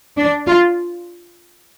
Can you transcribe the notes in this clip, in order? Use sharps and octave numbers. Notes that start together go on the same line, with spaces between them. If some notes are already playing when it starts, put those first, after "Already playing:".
D4
F4